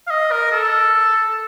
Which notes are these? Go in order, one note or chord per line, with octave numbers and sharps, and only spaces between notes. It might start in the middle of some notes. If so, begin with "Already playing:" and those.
F5
D#5
A#4
A4